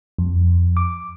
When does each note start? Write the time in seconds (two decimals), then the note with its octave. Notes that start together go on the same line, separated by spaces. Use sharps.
0.18 F2
0.77 D6